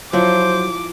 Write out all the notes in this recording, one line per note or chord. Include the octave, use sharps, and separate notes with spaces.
F3 F#3 E4 C5 D6